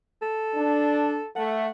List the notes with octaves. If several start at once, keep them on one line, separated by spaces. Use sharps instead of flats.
A4
D4
A3 F#5